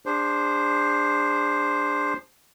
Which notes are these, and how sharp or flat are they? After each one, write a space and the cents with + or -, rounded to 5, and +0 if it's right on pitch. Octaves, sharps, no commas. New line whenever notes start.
D4 +0 G#4 -35 C5 +0